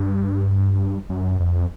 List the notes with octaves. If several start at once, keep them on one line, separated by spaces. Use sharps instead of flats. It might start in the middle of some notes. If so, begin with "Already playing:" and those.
Already playing: G2
F#2
F2